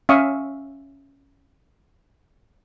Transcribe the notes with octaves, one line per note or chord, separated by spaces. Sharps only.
C#4 E5 F5 C#6 D#6